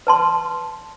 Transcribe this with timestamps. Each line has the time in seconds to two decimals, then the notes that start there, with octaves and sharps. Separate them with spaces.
0.07 B4 A5 C6